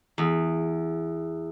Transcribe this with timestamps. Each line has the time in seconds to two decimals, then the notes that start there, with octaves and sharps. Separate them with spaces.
0.18 E2